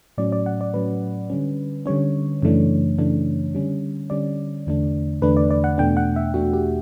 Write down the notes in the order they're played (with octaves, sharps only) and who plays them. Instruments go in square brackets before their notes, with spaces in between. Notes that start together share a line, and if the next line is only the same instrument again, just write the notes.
[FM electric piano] A2 F#3 C#4 D5
D5
F#5
D5
A2 F#3 C#4 B4
D3 G3 C#4
D3 G3 C#4 C#5
F#2 C#3 E3 A3 D4
F#2 C#3 E3 A3 D4
D3 G3 C#4
D3 G3 C#4 D5
E2 D3 A3 D4
E2 D3 A3 D4 B4
D5
D5
F#5
E2 B2 A3 D4 G5
F#5
E5
E2 B2 A3 D4 F#4
G4